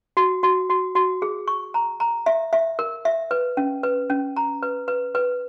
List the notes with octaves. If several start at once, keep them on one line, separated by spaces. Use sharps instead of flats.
F#4
F#4
F#4
F#4
G#4
C#6
A#5
A#5
E5
E5
A#4
E5
B4
C#4
B4
C#4
A#5
B4
B4
B4